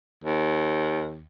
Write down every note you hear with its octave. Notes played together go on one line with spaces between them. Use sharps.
D#2